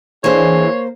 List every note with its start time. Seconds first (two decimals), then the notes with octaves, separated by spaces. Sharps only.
0.24 E3 A#3 D4 G#4 C5 C#5